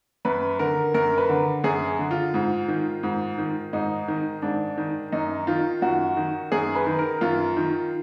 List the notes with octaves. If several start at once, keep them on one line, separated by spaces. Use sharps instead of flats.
F#2 B4
D3 A#4
F#2 A#4
B4
D3
F#2 G#4
D3
F4
G#2
D#3
G#2
D#3
G#2 D#4
D#3
G#2 D4
D#3
F#2 D#4
D#3 F4
F#2 F#4
D#3
F#2 G#4
B4
D#3
A#4
F#2 F4
D#3